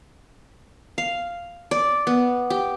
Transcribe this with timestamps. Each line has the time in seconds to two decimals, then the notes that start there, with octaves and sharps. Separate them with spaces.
0.98 F5
1.71 D5
2.07 B3
2.50 G4